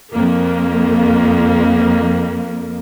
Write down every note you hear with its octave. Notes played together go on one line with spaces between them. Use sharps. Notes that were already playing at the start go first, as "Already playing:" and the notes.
F2 A#3